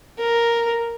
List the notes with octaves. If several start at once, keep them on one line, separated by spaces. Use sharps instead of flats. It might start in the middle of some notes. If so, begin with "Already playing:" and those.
A#4